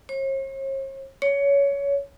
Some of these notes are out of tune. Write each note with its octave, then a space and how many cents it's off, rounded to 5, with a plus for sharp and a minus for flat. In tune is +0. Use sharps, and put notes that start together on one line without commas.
C#5 -45
C#5 +20